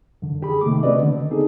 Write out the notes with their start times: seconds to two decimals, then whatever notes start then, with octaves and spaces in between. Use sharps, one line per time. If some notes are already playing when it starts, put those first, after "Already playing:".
0.22 F#2 D3
0.42 G4 G#4 B5
0.61 C3 D#3 A3 A#3 D6
0.83 C4 C#4 F#4 B4 D5 D#5
0.98 D3
1.30 B3 C4 D#4 G#4 A4